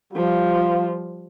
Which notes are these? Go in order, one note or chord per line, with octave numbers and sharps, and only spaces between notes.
F3 G3 F4